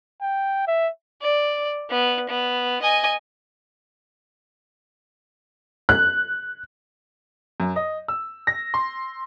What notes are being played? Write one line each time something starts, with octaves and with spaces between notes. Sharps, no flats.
G5
E5
D5
B3
B3
D#5 G#5
F#6
F#2
D#5
E6
A#6
C6